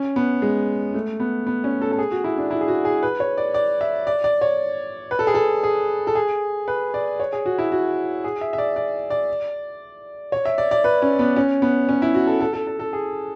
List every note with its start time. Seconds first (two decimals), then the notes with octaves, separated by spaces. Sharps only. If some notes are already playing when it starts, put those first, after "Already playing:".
Already playing: C#4
0.16 B3
0.42 G#3
0.94 A3
1.20 B3
1.47 B3
1.64 C#4
1.81 A4
1.92 A4
1.99 G#4
2.11 F#4
2.24 E4
2.38 D4
2.51 E4
2.61 G#4
2.68 F#4
2.85 G#4
3.03 B4
3.20 C#5
3.37 D5
3.54 D5
3.81 E5
4.07 D5
4.24 D5
4.41 C#5
5.11 B4
5.19 A4
5.27 G#4
5.34 A4
5.63 G#4
6.07 A4
6.15 G#4
6.68 B4
6.94 D5
7.20 C#5
7.33 G#4
7.46 F#4
7.58 E4
7.72 F#4
8.24 G#4
8.41 E5
8.53 E5
8.58 D5
8.76 D5
9.10 D5
10.32 C#5
10.45 E5
10.58 D5
10.71 D5
10.84 B4
11.02 C#4
11.19 B3
11.36 C#4
11.62 B3
11.89 C#4
12.02 E4
12.14 F#4
12.27 A4
12.40 A4
12.54 A4
12.67 A4
12.79 A4
12.93 G#4